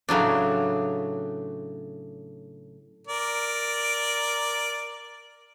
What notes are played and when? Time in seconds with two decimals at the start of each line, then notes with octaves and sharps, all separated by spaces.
0.09 A2 C#3 F#3 D4
3.07 A#4 D5